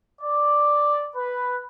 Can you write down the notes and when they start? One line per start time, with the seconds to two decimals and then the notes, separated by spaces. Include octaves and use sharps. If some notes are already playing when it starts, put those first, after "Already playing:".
0.22 D5
1.16 B4